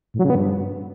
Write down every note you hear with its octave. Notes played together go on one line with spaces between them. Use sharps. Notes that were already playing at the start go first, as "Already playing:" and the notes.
A2
F#3
C#3
B3
G2